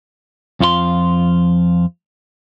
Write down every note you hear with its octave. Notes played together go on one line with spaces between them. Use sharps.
F2 F3 F4 F#4 C6